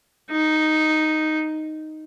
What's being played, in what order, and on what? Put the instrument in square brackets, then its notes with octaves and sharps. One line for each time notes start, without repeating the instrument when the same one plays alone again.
[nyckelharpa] D#4